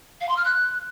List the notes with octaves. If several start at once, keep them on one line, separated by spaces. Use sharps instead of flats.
F5
C6
F6
F#6